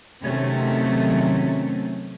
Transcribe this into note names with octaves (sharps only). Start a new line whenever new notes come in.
C3 D#3 F#3 A3 C4 C#4